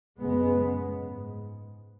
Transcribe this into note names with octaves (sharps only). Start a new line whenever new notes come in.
F#2 C#3 G#3 B3
G#2